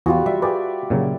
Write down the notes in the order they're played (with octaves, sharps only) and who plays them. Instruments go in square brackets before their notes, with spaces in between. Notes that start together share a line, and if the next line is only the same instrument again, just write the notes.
[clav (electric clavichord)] E2 G#4 [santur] G3 F4 F#4
[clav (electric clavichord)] G3 [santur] E5
[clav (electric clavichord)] G4 G#4 B4 [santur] D5
[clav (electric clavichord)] A#2 C#3 F#3